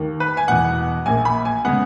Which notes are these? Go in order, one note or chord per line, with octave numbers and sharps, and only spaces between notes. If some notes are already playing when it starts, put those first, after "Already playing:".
Already playing: D#2 D#3 A#3
B4
G#5
E1 E2 B2 F#5
A#1 A#2 A#3 G#5
B5
G#5
C#3 G#3 B3 F#5